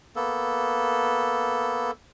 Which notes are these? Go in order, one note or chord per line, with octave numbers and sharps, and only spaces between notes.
A#3 B3 A4